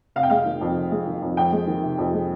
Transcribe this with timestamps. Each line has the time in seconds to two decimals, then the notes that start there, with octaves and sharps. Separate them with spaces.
0.16 F1 F5
0.23 G5
0.30 G#3 F5
0.46 D#3
0.61 F2
0.76 F1
0.91 G#3
1.07 D#3
1.23 F2
1.37 F2 G5
1.52 G#3
1.67 D#3
1.83 C3
1.98 F2
2.13 G#3